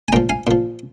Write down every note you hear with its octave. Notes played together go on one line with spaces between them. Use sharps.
G#5
A#2 F3 G5 A#5
F5 G#5
A#2 F3